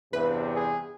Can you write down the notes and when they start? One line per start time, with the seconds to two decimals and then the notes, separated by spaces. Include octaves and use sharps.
0.13 E2 G2 C3 B4
0.56 G#4